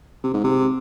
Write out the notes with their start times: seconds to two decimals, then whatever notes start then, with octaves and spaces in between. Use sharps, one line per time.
0.23 C3
0.34 G#2
0.44 C3